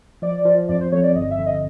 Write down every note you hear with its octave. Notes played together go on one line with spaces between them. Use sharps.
F3 D5
F3
F2 D5
C5
F2 C#5
D5
G1 D#5
E5
D3
D#5